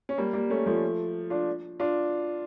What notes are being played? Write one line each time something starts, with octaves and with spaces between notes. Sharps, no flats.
C#4
G3 A#3
G3 A#3
A3 C#4
F3 A3
D4 F4
D4 F4